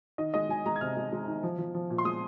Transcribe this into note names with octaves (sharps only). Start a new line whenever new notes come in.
D#3 D#5
G#3 D#5
G#3 G#5
G#3 A#5
G#6
C3 F6
G#3
G#3
D#3
F3
F3
F3
A#2
C6
G#3 D#6